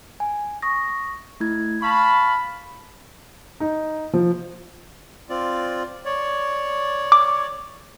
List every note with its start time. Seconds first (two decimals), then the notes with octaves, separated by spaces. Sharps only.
0.20 G#5
0.62 C#6 D#6 A#6
1.40 A3 E4 G#6
1.82 F5 A5 B5 C#6
3.60 D#4
4.13 F3
5.29 C4 F4 D5
6.05 C#5 D5
7.12 D6